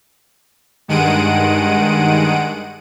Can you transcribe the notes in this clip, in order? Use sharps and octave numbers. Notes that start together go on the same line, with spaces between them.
G2 D#3 G#3 F#5 D7 D#7